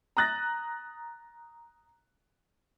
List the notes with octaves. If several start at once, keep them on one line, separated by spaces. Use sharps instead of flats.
A#5 D#6 F#6 A6 A#6